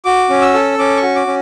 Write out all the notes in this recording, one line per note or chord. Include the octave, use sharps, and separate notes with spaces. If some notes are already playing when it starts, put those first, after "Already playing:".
F#4 D6
C#4
E6
A4
C#4 D6
C#6
F#4
D6
C#4